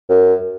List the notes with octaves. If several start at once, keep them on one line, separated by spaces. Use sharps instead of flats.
F#2